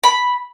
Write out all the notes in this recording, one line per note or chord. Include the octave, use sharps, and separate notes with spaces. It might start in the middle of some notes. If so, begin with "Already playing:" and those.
B5